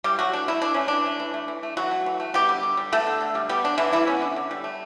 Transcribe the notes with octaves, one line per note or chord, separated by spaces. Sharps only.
E3 G3 G4
F#3 A3 F#4
E3 D4
A3 E4
E3 D4
A3 C#4
E3 D4
A3
E3
A3
E3
A3
E3 F#3 F#4
A3
E3
A3
G3 B3 G4
D3
D3
G3
A3 B3 A4
D3
D3
G3
G3 B3 G4
D3 D4
D3 E3 E4
E3 G3 E4
B3 C#4
D3
D3
G3
A3